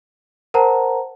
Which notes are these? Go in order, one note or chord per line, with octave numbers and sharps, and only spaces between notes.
A#4 C5 F#5 A5 A#5